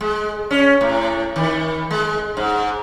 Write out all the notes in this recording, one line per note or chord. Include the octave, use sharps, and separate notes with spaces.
G#3
C#4
A2
D#3
G#3
G#2